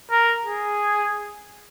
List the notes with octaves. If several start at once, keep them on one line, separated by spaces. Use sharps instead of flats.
A#4
G#4